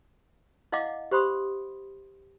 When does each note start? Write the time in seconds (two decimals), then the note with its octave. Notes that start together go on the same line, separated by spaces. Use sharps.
0.72 E4 D#5 F5 F#5 D6
1.11 G4 C5 B5 C6 D#6